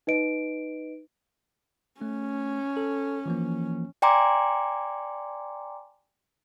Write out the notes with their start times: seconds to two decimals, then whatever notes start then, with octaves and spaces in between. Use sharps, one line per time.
0.07 D#4 B4 D#5 D7
2.02 A3 C#4
2.77 A4
3.26 E3 F3 A#3
4.02 D5 G5 G#5 A#5 C6 D6